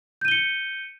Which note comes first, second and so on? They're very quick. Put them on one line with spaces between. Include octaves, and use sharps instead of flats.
G6 D#7 G7 C#7